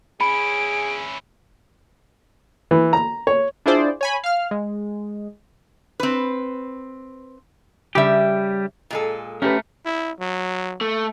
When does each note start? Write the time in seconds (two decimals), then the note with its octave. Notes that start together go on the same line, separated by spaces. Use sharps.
0.21 C#4 E4 G#4 B5 D7
2.71 E3
2.93 A#5
3.27 C#5
3.66 D4 E4 F4 G#4 C5 D5
4.01 C#5 G#5 B5
4.24 F5 F6
4.51 G#3
6.00 C4 B4
7.95 C#3 G3 G4 E5
8.90 A#2 G#3 A4
9.42 A3 C#4 G4 A#4 B4
9.85 E4
10.20 F#3
10.81 A3